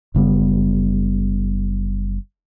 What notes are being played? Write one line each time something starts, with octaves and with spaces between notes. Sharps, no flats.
F#1 C#3 G3 B3